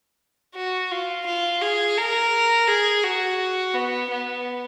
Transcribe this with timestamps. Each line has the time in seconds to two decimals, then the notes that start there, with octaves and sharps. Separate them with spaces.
0.55 F#4
0.91 F4
1.26 F4
1.61 G#4
1.97 A#4
2.68 G#4
3.04 F#4
3.74 B3
4.10 B3